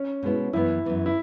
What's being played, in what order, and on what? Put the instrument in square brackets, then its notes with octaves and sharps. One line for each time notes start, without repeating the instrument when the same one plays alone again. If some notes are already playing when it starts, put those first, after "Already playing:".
Already playing: [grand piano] C#4
[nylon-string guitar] B2 G#3 B3 E4
[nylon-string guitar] F#2 E3 B3 [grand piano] E4
[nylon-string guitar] F#2 E3 B3
[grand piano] E4